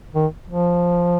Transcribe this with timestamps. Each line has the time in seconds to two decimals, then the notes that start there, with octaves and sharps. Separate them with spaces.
0.15 D#3
0.48 F3